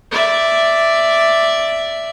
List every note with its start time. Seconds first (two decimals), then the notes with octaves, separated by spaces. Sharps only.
0.11 D5 E5